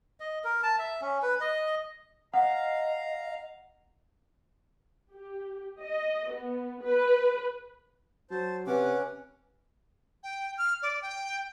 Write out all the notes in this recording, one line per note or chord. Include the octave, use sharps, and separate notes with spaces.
D#5
A#4
A5
E5
C#4
B4
D#5
D#5 F5 F#5 A#5
G4
D#5
B3
B4
F#3 C5 A5
C3 C#4 B4 F#5 D6
G5
F6
D5
G5